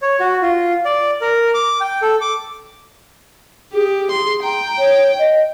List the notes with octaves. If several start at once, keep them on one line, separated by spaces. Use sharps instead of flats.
C#5
F#4
F4
D5
A#4
D6
G5
A4
D6
G4 G#4
C6
G5 A#5
C#5
D#5